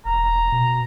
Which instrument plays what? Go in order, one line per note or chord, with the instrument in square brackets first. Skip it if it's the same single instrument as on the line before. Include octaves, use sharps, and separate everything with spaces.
[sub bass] E1 [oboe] A#5
[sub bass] B2